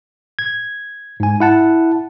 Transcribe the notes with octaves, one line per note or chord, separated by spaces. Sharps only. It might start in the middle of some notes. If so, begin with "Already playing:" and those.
G#6
G#2 G#5
E4 F#5 A5